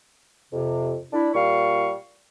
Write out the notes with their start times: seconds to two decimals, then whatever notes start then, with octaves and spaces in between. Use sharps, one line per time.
0.53 F2 C3
1.13 D4 E4
1.34 A#2 G3 F5 C#6